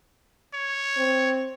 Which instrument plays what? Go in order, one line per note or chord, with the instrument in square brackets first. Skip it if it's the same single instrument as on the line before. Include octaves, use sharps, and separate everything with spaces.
[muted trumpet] C#5
[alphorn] C4